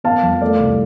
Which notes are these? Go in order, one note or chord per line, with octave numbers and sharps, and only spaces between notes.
B3 F5 A5
F2
A3 D5 F5
C2